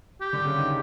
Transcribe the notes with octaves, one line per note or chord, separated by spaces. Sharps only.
G4
D3
C#3
D#3